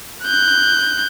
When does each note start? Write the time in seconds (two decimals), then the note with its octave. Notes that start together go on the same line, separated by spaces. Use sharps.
0.24 F#6 G6